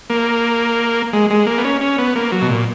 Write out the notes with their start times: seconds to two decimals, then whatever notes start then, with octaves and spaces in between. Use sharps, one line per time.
0.10 A#3
1.13 G#3
1.30 G#3
1.47 A#3
1.58 B3
1.64 C#4
1.81 C#4
1.98 B3
2.16 A#3
2.32 F#3
2.42 B2
2.49 A#2